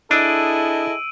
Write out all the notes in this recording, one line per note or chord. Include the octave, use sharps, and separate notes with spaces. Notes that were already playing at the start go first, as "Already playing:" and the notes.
D4 E4 G#4 A4 D#5 E6 D7 D#7